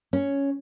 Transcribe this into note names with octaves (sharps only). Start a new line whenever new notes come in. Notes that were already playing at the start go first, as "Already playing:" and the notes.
C#4